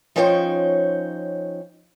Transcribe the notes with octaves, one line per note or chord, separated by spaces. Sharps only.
F3 C#4 D#4 C5 C#5 G5